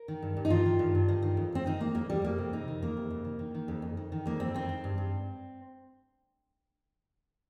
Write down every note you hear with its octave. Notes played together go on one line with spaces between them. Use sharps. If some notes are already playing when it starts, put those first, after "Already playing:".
Already playing: A#4
D#3
G2
G2
D#4
D#3 F4
D#3
G2
G2
D#3
D#3
F2
F2 C4
D#3 D#4
D#3 A#3
F2 A#3
F2 G3
F2 A#3
C3
F2 D#4
D#3
F2 A#3
C3
F2
D#3
D#3
D#3
F2
F2
D#3
D#3
F2 A#3
F2 C4
D#3 C4
D#3
G2
G2